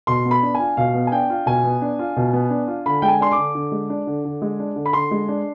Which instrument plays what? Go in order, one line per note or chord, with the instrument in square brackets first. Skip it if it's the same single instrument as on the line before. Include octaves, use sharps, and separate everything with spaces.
[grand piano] B2 C6
B3
B5
D4
F4 G#5
B2 F5
B3
G#5
D4 G5
F4
B2 G#5
B3
D4
F4
B2
B3
D4
F4
D3 B5
G#3 G5
G#5
D4 C6
D6
D3
D3
G#3
D4
D3
D3
G#3
D4
D3
B5
D3 C6
G#3
D4